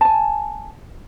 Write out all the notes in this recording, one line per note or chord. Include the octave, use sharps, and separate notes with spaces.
G#5 A5